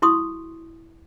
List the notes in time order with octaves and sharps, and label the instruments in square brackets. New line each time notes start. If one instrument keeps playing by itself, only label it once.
[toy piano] E4 F#4 C6 C#6 D#6